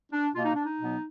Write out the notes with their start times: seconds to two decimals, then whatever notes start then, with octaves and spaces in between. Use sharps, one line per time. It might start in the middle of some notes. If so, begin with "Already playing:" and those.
0.12 D4
0.35 B2 A#3 F4
0.45 D#4
0.55 D4
0.65 D#4
0.80 B2 F#3 B3